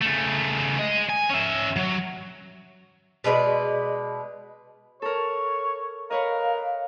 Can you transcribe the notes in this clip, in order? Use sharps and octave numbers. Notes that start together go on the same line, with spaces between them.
C#3 A3
G#3 D#5
G#5
C#4 E5
F#3
B2 G#3 B4 D5
A4 A#4 C#5
A#4 B4 C#5 D#5 F5